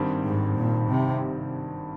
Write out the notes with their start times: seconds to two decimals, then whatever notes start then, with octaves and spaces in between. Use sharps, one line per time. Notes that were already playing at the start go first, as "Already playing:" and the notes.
Already playing: G#1 G2 D#3 G3 C4
0.25 G#2
0.58 A#2
0.90 C3